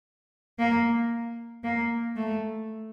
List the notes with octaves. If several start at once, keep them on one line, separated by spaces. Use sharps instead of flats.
A#3
A#3
A3